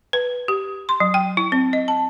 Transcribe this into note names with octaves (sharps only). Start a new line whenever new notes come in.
B4
G4
C6
F#3
G5
E4
C4
D#5
A5